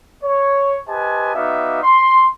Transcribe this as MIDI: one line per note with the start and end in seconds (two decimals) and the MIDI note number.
0.24 0.76 73
0.88 1.32 67
0.88 1.32 71
0.88 1.32 72
0.88 1.32 75
0.88 1.32 80
0.88 1.32 81
1.35 1.81 59
1.35 1.81 63
1.35 1.81 66
1.35 1.81 74
1.35 1.81 76
1.35 1.81 77
1.83 2.26 84